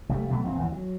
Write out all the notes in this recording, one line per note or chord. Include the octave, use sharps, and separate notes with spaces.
F1 G3 A3
B2 F#3 A3
D#1 F2 A#2 C4
D#2 E3
F#3